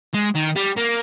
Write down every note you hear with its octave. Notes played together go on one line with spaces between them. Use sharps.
G#3
D#3
G3
A#3